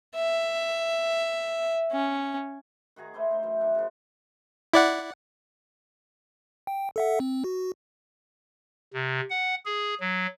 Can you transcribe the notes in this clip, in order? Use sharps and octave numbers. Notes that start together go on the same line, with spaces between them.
E5
C#4
D#3 F#4 G#4 A#5
A3 E4 C5 D6
D#4 C5
F#2 E3 D#4
D#3 D4 E5
C#3 F3
E4 D5 F#5
G5
A4 E5 F#5
C4
F#4
C3
F#5
G#4
F#3